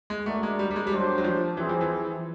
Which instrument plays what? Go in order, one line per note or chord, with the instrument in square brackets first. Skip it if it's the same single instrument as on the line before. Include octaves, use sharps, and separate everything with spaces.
[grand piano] G#3
[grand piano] A3 [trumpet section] D4 F#4 A#4 D5
[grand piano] G#3
G3
G3
G#3
G3
[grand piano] F#3 [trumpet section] A3 D4 G4 C5
[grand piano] F#3
F3
[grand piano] E3 [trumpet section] C4 E4 G#4
[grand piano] F3
E3